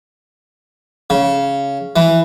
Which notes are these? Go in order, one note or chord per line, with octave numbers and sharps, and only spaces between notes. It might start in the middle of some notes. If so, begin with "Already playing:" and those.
C#3
E3